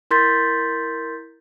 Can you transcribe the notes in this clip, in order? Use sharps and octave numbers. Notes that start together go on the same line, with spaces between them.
E4 A#4 C6 G6 A6 B6